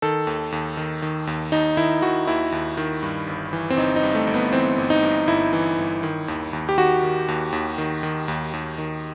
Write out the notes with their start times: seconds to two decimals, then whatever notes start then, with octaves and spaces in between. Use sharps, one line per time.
0.02 D#3 A4
0.27 D#2
0.52 D#2
0.77 D#3
1.02 D#3
1.27 D#2
1.52 D#2 D#4
1.77 D#3 E4
2.02 D#3 F#4
2.27 D#2 E4
2.52 D#2
2.77 D#3
3.03 G2
3.27 G1
3.53 E3
3.70 C4
3.77 G1 D#4
3.96 D#4
4.03 G2
4.15 A3
4.27 G1
4.34 B3
4.52 E3 C4
4.78 G1
4.90 D#4
5.03 G2
5.28 G1 E4
5.53 E3
5.78 G1
6.03 D#3
6.28 D#2
6.53 D#2
6.69 G4
6.78 D#3 F#4
7.03 D#3
7.28 D#2
7.52 D#2
7.78 D#3
8.03 D#3
8.28 D#2
8.53 D#2
8.78 D#3